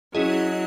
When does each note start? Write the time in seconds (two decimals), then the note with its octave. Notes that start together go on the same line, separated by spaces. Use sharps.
0.15 F#3 C#4 E4 G#4 D#5